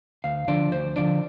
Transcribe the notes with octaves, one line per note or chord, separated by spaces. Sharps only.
D2 F5
D3 F3 D4 D5
D2 C5
D3 F3 D4 D5